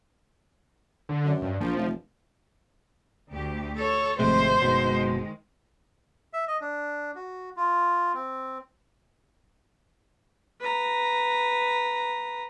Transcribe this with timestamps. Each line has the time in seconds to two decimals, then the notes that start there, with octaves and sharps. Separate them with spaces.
1.09 D3
1.24 F#2
1.42 G2
1.61 A#1 F3
1.77 F1
3.32 D2 G4
3.79 A4 C#5
4.19 G#1 F2 C3 G#3 A3 C5
4.61 F#1 B2 D#3 G#3
6.33 E5
6.48 D#5
6.61 D4
7.15 F#4
7.57 F4
8.14 C4
10.60 B4 A#5